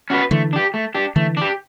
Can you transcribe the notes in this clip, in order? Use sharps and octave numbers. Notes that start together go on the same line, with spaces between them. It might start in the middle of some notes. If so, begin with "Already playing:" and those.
C#4 F#4 B4
D3 E3 A3
D4 G4
A3
D4 G4
D3 E3 A3
D4 G4